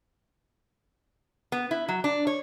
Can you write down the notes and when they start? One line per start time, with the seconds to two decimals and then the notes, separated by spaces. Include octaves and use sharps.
1.52 B3
1.71 E4
1.88 F#3
2.04 D4
2.27 C#5